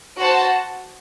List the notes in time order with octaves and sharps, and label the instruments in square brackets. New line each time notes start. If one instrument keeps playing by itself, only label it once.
[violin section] F#4 C5 F#5 A5